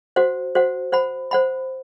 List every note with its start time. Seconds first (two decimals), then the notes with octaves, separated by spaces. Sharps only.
0.16 F#4 C5 F#5
0.55 F#4 C5 F#5
0.92 C5 F#5 B5
1.31 C5 F#5 B5